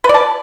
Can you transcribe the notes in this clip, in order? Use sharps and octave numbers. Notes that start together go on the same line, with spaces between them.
B4
D5
A5